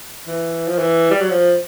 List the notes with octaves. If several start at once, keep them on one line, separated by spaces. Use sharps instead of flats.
E3
F3
E3
G3
F#3
F3